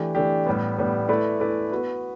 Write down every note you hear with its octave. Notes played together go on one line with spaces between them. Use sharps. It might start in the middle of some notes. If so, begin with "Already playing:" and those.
Already playing: E3 A3 D4 G4
E3 A3 D4 G4
A2 G3 B3
A2 G3 B3
A3 E4 B4 D5
A3 E4 B4 D5
B3 F#4 B4